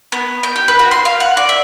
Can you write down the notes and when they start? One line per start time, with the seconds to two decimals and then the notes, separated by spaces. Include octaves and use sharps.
0.12 B3
0.43 G6
0.56 G4
0.68 B4
0.79 F#4
0.91 C6
1.05 F5
1.20 F#5
1.37 D5
1.49 E5